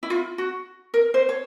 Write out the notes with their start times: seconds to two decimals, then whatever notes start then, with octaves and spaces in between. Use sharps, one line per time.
0.03 E4
0.10 F4
0.38 F#4
0.94 A#4
1.14 C5
1.29 C#5